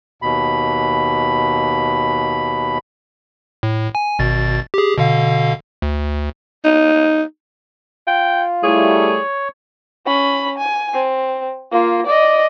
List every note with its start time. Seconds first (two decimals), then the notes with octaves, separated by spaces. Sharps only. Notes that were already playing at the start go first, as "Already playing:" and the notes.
0.22 D#2 B2 B5
3.63 A2
3.95 G#5
4.19 G#1 B2 A6
4.74 G4 G#4
4.98 B2 D3 F5
5.82 D2
6.65 D#4
8.07 F4 G5
8.63 G3 A3 E4 G#4 C#5
10.07 C#4 B5
10.58 G#5
10.94 C4
11.72 A#3 F4
12.06 D5 D#5